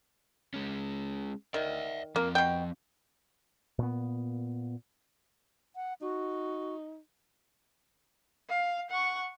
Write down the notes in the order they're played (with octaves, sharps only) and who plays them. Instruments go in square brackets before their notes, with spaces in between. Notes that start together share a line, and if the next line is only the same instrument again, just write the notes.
[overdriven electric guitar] G#3 C#4
[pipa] D#3 [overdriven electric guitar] D5 E5
[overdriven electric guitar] F3 C4 [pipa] A#3
[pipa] B2 G5
[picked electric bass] A#2 B3
[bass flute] F#5
[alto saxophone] D#4 [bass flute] F#4
[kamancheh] F5
F#5 C#6